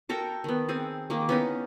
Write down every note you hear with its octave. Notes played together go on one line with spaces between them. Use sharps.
F#4 A4 A#4 G5
D#3 B3
C4 G#4 A4
D#3 A#3 G#4
B3 C#4 D#4 E4